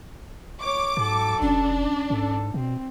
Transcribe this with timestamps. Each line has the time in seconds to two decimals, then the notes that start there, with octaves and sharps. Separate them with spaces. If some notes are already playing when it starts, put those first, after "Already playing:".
0.63 C#5 D6
0.97 G#2 F#3 A4
1.42 F1 C#4 D4
2.10 G#2 A4
2.54 B2 C4